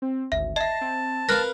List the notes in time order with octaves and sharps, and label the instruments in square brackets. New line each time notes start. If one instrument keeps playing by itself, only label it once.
[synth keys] C4
[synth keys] G#1 D2 [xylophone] E5
[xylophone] D#5 E5 [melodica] A5 [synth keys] A#6 C7
[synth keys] C4
[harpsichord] A#4 B4 F5 [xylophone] F6 F#6 A#6